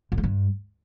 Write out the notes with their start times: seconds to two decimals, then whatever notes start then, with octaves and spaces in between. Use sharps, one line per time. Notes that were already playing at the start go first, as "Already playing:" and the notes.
0.12 D3
0.18 G3
0.23 G2